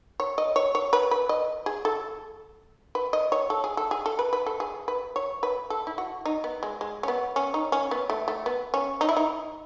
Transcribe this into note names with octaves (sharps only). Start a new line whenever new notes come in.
C#5
D#5
C#5
C#5
B4
B4
D#5
G#4
A4
B4
D#5
C#5
A4
G#4
A4
G#4
A4
B4
B4
A4
G#4
B4
C#5
B4
A4
E4
F#4
D#4
B3
G#3
G#3
C#4
B3
C#4
D#4
C#4
B3
A3
A3
B3
C#4
D#4
E4
D#4